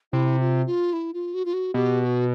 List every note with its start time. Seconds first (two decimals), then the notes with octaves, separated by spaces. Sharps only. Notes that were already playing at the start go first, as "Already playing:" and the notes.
0.12 C3 E4
0.40 F4
0.66 F4
0.93 E4
1.14 F4
1.34 F#4
1.45 F4
1.53 F#4
1.74 B2 G4
2.01 G4
2.05 F#4